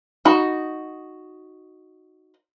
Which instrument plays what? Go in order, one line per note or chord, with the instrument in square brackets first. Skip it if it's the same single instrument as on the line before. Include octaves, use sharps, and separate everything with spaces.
[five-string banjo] D#4 F#4 B5